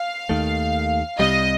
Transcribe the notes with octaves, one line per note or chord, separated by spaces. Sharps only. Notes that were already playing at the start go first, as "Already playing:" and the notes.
Already playing: F5
D#2 D#3 A3
C2 C3 G3 D#5